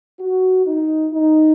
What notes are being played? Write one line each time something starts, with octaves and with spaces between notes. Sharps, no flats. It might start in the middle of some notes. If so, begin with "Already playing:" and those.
F#4
D#4
D#4